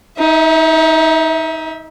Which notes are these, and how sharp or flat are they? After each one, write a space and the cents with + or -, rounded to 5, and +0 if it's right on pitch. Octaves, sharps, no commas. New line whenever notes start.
D#4 +25 E5 -20